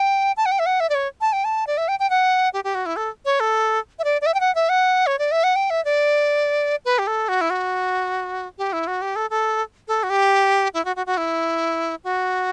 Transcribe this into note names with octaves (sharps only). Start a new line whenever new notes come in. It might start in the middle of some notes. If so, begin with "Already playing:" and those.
Already playing: G5
A5
F#5
G5
E5
F#5
E5
D5
C#5
A5
G5
A5
D5
E5
G5
G5
F#5
G4
G4
F#4
E4
A4
C#5
A4
E5
D5
D5
E5
G5
F#5
E5
F#5
C#5
D5
E5
F#5
G5
E5
D5
B4
G4
A4
F#4
E4
F#4
G4
E4
F#4
G4
A4
A4
A4
F#4
G4
E4
F#4
F#4
F#4
E4
F#4